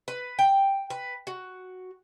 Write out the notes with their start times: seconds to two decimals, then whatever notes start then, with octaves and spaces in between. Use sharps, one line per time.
0.08 B4
0.39 G5
0.90 B4
1.27 F#4